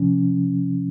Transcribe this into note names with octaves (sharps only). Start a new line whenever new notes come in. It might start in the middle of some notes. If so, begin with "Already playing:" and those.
Already playing: C3 F3 C#4